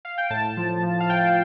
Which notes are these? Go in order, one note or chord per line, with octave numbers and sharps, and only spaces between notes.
F5
G5
A2 A5
F3
F3
F5
A2 G5